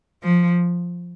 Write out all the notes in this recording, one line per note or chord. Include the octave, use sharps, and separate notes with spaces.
F3